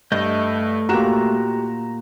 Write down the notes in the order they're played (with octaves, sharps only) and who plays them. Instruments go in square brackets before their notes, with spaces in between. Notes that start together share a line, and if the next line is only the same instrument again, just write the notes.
[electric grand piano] G2 [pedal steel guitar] A3 D#5 G6
[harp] A#2 F#6 [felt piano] F#4 G4 E7 [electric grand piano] A#5